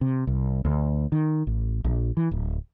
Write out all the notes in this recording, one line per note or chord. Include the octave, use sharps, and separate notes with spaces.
C3
C2
D2
D#3
A1
A#1
E3
D1